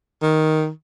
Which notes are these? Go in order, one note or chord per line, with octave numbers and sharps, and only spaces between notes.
D#3